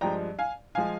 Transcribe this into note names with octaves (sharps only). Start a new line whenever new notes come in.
G2 F3 G#3 G5 A#5
F5 G#5
F3 G#3 F5 G#5